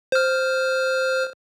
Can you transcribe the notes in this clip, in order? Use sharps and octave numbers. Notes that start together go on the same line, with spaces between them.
C5 F6